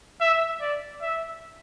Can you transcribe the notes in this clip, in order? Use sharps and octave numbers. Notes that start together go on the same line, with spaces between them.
E5
D5
E5